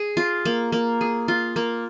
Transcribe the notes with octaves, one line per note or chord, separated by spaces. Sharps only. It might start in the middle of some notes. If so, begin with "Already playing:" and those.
Already playing: G#4
F4
A#3
A#3
G#4
F4
A#3